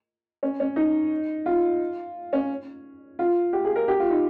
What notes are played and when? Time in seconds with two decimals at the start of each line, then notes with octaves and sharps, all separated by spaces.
0.43 C#4
0.60 C#4
0.76 D#4
1.46 F4
2.33 C#4
3.19 F4
3.53 G4
3.65 G#4
3.76 A#4
3.88 G4
4.00 F4
4.10 D#4